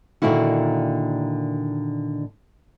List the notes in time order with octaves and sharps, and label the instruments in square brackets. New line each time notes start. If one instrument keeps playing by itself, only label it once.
[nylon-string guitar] A#2 D3 D#3 A#3 E4 F#4